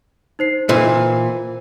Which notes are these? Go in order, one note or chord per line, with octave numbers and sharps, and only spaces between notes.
D#4 C5 C7
A#2 E3 C5